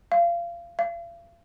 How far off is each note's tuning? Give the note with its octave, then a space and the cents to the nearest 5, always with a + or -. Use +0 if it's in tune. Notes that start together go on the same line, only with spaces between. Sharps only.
F5 -25
F5 -45